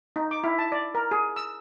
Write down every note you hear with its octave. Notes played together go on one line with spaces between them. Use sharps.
D#4
D6
E4
A5
D5
A#4
G#4
E6